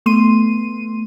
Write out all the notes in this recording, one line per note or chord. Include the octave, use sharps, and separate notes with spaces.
A3 B3 C6 D#7